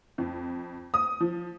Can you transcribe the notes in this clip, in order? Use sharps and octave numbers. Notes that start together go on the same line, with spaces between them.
F2
D#6
F3